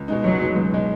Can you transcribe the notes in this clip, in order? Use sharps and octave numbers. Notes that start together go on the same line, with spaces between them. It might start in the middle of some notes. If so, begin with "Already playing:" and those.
Already playing: C#2
B2 G#3 D#4
C#2 F#3
B2 G#3 D#4
C#2
B2 G#3 D#4